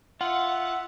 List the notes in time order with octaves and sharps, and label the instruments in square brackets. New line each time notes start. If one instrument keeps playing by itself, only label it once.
[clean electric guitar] F4 [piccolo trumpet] E5 [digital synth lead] F#5